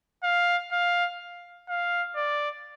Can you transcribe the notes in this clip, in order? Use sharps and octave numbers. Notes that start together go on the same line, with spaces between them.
F5
F5
F5
D5